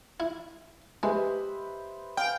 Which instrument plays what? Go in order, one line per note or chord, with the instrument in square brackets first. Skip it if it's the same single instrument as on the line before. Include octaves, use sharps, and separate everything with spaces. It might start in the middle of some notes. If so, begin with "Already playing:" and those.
[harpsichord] E4
[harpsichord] G#3 [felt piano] G4 D#5 E5 [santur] B4 C5
[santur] F5 G#5 [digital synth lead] G5